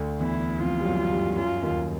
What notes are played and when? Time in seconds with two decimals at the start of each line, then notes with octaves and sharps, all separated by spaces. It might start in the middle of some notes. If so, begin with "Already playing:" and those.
Already playing: D2 D3
0.20 E2 E3 E4
0.59 F2 F3 F4
0.80 G3
0.85 F#2 F#3
1.10 G2 G3
1.36 F#2 F#3 F4
1.62 D#2 D#3